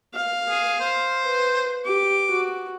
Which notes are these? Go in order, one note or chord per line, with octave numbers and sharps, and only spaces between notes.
F5
G#4
C5
B4
G4 D6
F#4